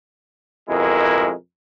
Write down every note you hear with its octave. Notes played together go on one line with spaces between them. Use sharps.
F2 B2 G#3 E4 A#4